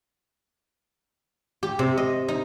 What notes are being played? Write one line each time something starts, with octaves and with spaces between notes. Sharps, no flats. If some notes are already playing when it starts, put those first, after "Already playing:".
G4
C3
D#5
D#4